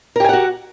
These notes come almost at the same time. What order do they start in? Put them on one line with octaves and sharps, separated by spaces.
A#4 G4 G#5 F#5 F#4